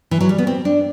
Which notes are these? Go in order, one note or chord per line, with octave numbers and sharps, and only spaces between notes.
E3
F#3
G3
B3
C4
D4